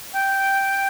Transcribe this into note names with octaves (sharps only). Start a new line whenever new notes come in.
G5